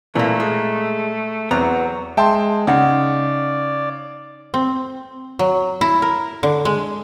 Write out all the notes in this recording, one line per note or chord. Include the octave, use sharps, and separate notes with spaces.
A#2 E3 A3 A#3
G#3
E2 F#3 B3 C4 A#5
G#3 E5 G5 A5 C6
C#3 D#4 D5 D#5 F#5
C4
F#3
E4
A#4
D3
G#3